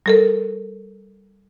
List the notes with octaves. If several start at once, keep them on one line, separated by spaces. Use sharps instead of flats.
G3 A4 A#4